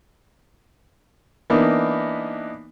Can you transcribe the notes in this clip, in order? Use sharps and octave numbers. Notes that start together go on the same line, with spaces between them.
E3 A#3 B3 D4 D#4